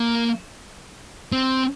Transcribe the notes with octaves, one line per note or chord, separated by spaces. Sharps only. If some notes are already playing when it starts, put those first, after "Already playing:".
Already playing: A#3
C4